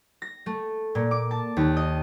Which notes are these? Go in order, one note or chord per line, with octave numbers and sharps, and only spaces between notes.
A#6
A3
A#2
D6
A5
D#2
D#5